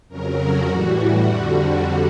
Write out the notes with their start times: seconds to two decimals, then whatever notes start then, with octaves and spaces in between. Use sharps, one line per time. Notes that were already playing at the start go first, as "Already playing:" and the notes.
0.08 F2 C#3 F#3 A#4
0.37 F#4
0.67 A2 E3 G3
1.25 F2 D3 G3